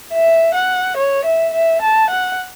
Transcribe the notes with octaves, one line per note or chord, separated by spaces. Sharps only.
E5
F#5
C#5
E5
E5
A5
F#5